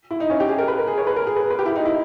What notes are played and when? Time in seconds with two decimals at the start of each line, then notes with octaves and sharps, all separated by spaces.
0.11 E4
0.20 D#4
0.30 C#4
0.40 G4
0.49 G#4
0.58 A#4
0.68 B4
0.79 A#4
0.87 G#4
0.98 C#5
1.07 B4
1.16 A#4
1.27 G#4
1.36 B4
1.50 B4
1.59 G4
1.66 E4
1.76 D#4
1.85 E4